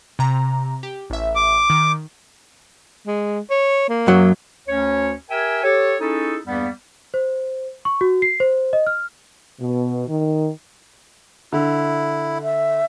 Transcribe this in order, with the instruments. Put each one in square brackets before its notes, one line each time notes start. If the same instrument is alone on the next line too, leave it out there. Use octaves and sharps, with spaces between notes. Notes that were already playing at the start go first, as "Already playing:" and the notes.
[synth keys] C3 A#5
G4
A1 E5
[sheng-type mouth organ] D6
[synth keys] D#3
[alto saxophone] G#3
C#5
A#3
[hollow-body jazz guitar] F#2 F#3
[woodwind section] D2 C#4 C#5
G4 A#4 E5 G5 G#5
G4 A4 C#5
C#4 D#4 E4 G#4 A4
E2 G2 G3 A#3 B3
[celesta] C5
C#6
F#4
C7
C5
D#5
F6
[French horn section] B2
D#3
[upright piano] D3 [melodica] E4
[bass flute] E5